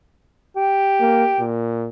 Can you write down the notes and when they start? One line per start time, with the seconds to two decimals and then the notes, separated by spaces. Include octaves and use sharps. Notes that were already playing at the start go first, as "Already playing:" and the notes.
0.56 G4
1.00 A#3
1.40 A#2